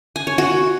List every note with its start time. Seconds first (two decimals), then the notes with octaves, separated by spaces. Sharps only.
0.16 G#5
0.27 C#5
0.38 F#4